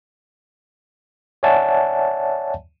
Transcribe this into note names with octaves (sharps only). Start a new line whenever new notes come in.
C#5 D5 E5 F#5 G#5 A5